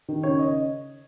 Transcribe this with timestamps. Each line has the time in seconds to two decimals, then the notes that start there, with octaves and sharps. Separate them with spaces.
0.08 D#3
0.23 C#3 C#5
0.39 D#5